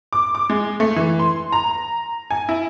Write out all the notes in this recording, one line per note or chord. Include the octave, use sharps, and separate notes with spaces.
D6
D6
G#3
A3
E3
C6
A#5
G#5
E4